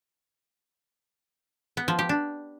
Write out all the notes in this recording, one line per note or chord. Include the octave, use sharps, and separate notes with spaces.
B3
F3
G4
D4